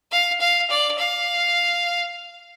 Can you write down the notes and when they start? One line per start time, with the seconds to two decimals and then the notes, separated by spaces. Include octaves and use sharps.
0.12 F5
0.40 F5
0.70 D5
0.99 F5